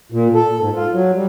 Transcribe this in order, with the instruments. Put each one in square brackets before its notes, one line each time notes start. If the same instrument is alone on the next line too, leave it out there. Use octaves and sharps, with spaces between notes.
[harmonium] A#2
A4
G#2
F4
F#3
G3